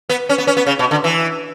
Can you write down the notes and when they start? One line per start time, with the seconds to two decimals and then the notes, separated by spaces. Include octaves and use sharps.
0.09 B3
0.29 C#4
0.38 B3
0.47 C#4
0.57 B3
0.67 C#3
0.79 B2
0.91 D3
1.04 E3